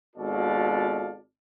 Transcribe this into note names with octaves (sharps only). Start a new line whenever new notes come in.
G#1 B2 F4 A4 D5 F5